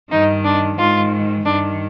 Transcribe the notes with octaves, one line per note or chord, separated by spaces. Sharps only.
G2 D#3 D#4
D4
G#2 D#3 F4
G2 D#3 D4